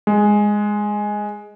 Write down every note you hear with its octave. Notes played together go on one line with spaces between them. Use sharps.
G#3